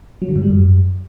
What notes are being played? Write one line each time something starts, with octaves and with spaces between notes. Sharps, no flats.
F#3
D3
G#2
G3
F#2